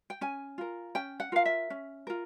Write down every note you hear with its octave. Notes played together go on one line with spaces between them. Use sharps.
G5
C#4 G#5
F4 A#4
C#4 G5
F#5
F4 A#4 F5
E5
C#4
F4 A#4